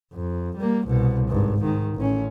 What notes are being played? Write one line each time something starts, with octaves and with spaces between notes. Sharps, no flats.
F2
G3 A#3
C2 B2
G#1 G2
G#2 D#3
A1 C#4